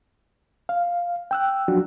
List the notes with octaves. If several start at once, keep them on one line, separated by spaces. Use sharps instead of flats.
F5
G5 E6 F#6
F3 F#3 D4 F#4